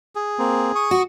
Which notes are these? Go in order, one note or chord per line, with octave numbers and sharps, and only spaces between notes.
G#4
A#3 C4
C#6 D#6
F#4